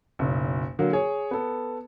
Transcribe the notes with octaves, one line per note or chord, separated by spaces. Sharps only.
F#1 B1
D3 F#3 A#3
G#4 C#5
B3 A4